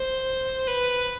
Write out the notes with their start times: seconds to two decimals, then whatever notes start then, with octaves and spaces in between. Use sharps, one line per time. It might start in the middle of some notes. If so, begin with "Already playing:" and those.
Already playing: C5
0.67 B4